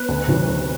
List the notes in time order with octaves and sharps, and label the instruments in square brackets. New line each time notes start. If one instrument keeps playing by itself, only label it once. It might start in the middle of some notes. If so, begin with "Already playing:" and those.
Already playing: [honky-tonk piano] B3 B4
D2
C3 D#3 F#3
D2